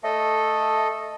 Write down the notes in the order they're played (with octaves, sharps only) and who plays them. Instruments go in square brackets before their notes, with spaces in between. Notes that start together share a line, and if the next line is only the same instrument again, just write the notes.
[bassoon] A3 [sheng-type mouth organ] A4 D#5